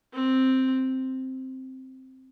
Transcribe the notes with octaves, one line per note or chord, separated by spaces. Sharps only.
C4